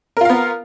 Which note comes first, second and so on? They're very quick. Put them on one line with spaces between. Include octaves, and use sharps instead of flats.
A#4 F4 F5 B3